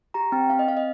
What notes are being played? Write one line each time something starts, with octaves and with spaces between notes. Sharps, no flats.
G4 A#5
C4 G5
C4 F5
D#5
C4 F5
D#5